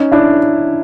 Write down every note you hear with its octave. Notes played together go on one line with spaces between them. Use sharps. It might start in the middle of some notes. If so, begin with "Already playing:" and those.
Already playing: C#4 D#4
D4 E4